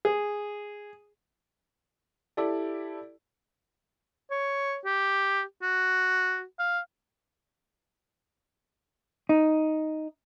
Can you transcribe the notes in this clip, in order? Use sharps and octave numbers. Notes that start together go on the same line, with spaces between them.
G#4
E4 G4 A4 D5
C#5
G4
F#4
F5
D#4